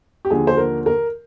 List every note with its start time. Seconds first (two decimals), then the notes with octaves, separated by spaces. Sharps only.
0.25 G4
0.30 D#2 D3 F3 G#4
0.47 C5
0.57 A#4
0.86 A#4